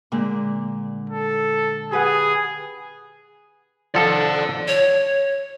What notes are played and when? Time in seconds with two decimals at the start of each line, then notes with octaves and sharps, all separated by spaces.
0.12 A#2 D3 G#3
1.10 A4
1.92 G4 G#4 B4 F#5
3.95 F3 A4 D5 F#5 A5
4.68 C#5